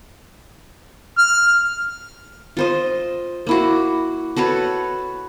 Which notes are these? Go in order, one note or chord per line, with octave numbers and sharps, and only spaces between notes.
F6
F4 C5 D#5
A#3 E4 F#4
F#4 A4 B4 C#5